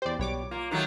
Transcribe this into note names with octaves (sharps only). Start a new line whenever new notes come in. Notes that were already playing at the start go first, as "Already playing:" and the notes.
E2 G4 C5 D5
B1 B2 G3 B4 C#5 D6
A#3 F4
D#3 F#3 A3